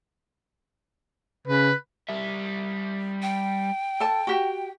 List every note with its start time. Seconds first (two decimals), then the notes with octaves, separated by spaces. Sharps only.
1.48 C#3 B4
2.09 G3 E5
3.22 G5
4.00 A4 A5
4.27 F#4 G4